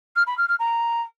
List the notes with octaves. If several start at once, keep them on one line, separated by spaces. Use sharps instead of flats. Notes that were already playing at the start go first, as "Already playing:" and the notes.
F6
B5
F6
F6
A#5